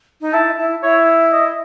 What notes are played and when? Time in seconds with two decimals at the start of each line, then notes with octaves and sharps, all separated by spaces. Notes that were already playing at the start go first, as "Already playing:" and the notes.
0.21 D#4
0.33 E4 A5
0.57 E4
0.82 E4 C#5
1.32 D#5